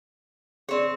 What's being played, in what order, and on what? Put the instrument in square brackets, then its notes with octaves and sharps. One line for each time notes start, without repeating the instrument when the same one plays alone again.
[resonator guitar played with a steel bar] C4 C#5 [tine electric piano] G#4 D5